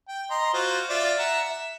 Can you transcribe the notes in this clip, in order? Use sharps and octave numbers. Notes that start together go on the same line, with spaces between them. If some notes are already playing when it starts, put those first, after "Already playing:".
G5
D#5 A#5 C6
F4 F#4 C5
F4 D5 E5
E5 F#5 A#5
E5